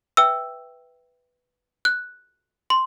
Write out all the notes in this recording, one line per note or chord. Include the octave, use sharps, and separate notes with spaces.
B4 E5 G5 E6
F#6
C6